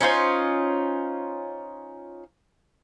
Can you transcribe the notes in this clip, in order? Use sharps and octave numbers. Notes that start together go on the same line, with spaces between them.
C#4 D#4 F4 C5